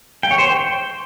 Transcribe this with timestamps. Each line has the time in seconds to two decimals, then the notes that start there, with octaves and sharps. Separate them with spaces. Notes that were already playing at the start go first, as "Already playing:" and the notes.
0.23 G5
0.31 C#5
0.38 C5
0.46 G5